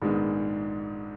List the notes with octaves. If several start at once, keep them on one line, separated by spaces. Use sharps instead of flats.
A#1 G#2 D#3 G#3 B3